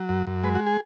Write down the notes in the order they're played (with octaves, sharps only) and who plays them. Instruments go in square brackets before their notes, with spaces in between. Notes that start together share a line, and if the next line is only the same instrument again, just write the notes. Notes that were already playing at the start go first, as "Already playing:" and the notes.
Already playing: [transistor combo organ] F#3
F#2
F#2
G#3 B4
F#4
G#4